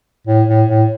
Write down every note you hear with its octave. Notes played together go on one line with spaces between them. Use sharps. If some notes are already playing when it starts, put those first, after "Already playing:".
A2
A2
A2